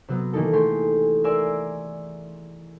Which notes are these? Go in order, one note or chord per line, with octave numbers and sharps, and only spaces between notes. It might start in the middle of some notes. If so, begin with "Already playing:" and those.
C3 F#3 B3
D#3 E3 A#3 D#4 A4
A3 G4 G#4 C6
A#4 D5 E5 G#5 C6 E6